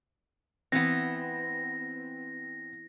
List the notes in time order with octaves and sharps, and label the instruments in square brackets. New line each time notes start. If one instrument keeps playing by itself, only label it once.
[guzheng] E3 B3 [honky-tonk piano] C4 [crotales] A#6